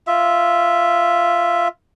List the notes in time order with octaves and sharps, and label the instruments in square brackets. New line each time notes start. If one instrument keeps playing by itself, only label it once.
[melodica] F4 E5